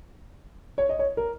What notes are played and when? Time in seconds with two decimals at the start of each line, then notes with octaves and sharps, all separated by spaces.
0.78 C#5
0.89 D#5
0.99 C#5
1.17 A#4